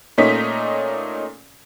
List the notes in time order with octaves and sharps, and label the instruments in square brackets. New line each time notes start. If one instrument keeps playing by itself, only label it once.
[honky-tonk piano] A#2 A3 C#4 D#4 B6